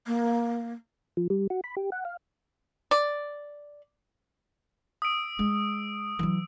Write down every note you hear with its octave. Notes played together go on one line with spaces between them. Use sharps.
A#3
F3
G3
F#4
B5
G4
F#5
F5
D5
D#6 E6 D7
G#3
E3 F#3